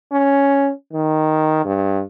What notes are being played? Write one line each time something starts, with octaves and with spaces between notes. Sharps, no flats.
C#4
D#3
G2